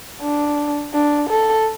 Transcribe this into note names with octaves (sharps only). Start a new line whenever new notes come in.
D4
D4
A4